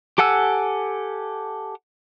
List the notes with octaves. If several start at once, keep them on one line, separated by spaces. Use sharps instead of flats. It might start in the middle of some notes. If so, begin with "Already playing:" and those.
G4 A4 F#5 G#5 E6